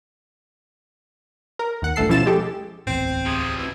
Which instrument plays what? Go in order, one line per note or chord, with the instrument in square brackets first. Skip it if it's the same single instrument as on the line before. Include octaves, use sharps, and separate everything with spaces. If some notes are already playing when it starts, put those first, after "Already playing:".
[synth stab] A#4
D#2 F#5
G1 D2 A3 A4 C7
B2 F3 C#4 E4 A6 E7
G#3 G4 A4
[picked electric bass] D1 A1 E2 [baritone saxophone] C4
[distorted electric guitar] C3 F3 [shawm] G#4
[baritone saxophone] B2 [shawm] E4